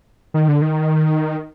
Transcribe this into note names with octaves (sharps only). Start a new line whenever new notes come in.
D#3
D3
D#3